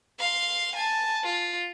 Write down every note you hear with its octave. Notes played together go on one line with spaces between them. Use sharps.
F5 C6
G#5 A5
F4